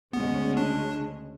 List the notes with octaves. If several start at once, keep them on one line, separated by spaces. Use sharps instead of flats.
D2 C#3 G#3 B3 C#4
D4